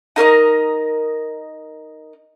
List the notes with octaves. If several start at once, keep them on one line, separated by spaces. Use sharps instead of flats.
D#4 A#4 C#5 D#5